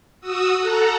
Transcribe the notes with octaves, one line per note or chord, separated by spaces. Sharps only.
F#4 D#6 E6
A4 F#5 A#5